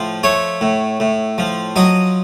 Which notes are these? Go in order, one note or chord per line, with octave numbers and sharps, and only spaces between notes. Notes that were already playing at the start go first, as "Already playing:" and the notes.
Already playing: A2 F3
A3 C#5
A2
A2
F3
F#3 D#5